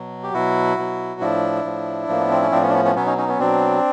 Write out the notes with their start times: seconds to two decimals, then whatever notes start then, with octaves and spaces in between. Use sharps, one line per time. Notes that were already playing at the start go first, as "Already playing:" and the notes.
Already playing: B2 F#3
0.23 G4
0.34 B2 F#3 E4 F#4
0.78 B2 F#3
1.21 A2 F3 D4 E4
1.65 A2 F3
2.08 A2 F3 A#3
2.21 B3
2.31 C4
2.42 C#4
2.51 A2 F3 C4 D4
2.63 B3 C#4
2.69 D4
2.73 B3 C#4
2.85 B3 C#4
2.95 B2 F#3 B3 C#4
3.06 C#4 D#4
3.18 C#4 D#4
3.28 B3 C#4
3.39 B2 F#3 C4 D4